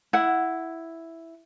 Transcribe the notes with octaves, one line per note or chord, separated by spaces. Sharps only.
E4 F#5